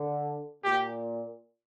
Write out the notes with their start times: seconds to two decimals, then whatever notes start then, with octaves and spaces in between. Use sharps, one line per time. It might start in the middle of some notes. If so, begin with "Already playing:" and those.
Already playing: D3
0.64 A#2 G4